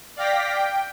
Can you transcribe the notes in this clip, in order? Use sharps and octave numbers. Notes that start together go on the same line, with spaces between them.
D5 F5 G5 A#6 B6
G5